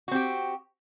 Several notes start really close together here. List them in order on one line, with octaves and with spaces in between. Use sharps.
F#4 C4 G4